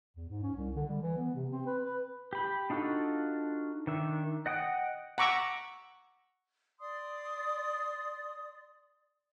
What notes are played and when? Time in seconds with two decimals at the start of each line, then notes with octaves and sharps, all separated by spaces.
0.16 E2
0.29 G#2
0.43 C#4
0.56 C2
0.76 D3
0.89 G3
1.02 E3
1.18 B3
1.35 C3
1.51 C4
1.66 B4
1.83 B4
2.33 G4 B5
2.70 D4 D#4 F4 F#4 A4
3.87 D#3 D4 E5
4.46 D#5 F#5 G5 D#6
5.18 F#5 A#5 C#6 D6 E6
6.79 D5 C6 D#6